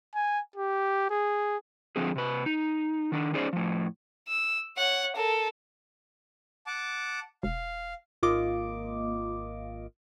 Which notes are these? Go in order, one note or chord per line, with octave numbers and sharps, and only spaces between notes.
G#5
G4
G#4
F2 D3 F3 C4 G#4
C3 B4
D#4
D#3 D4
C#4 D#4 G#4 C5 D5
A2 F3
E6
C#5 F#5
A4 A#4
F#5 A5 D6
E1 F5
G#1 A#3 F4 D#5 D6